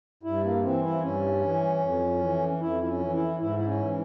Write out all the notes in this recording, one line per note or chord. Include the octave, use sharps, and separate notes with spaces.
G2 E4
A#3
E3 C4
E4
G2 C#4
E3
F2
E3
F2 E4
E4
C#4
E3
E4
G#2 E4
E4
C#4
E3